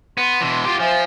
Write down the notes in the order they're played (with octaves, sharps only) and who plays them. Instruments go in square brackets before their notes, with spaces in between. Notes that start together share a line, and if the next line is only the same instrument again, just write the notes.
[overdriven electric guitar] B3 [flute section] C6
[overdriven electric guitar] B2 E3
F4 G4
[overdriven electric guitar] F3 [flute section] C5 E5 G#5